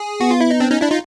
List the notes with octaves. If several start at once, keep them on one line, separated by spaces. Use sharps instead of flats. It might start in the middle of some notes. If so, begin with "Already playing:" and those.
Already playing: G#4
B3 F#4
F4
E4
D#4
C4 D4
C#4 D#4
D4 E4
D#4 F4